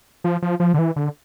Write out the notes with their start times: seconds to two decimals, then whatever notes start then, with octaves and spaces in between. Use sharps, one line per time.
0.24 F3
0.42 F3
0.60 F3
0.74 D3
0.79 E3
0.96 D3